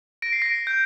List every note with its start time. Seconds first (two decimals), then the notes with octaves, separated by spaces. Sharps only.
0.22 A#6 D7
0.32 C7
0.42 A#6 D7
0.52 A#6
0.67 G6